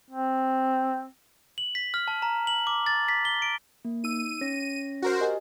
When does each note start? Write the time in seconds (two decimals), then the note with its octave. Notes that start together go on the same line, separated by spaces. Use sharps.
0.10 C4
1.58 F#7
1.75 B6
1.94 F6
2.08 A5
2.22 A#5
2.47 F#7
2.67 D6
2.86 A6
3.08 B6
3.25 G7
3.42 D7
3.85 A#3
4.04 D#4 E6 D#7
4.41 C#4 C#5 A#6
5.02 F#4 A#4 C5
5.20 G4 D#5 G#5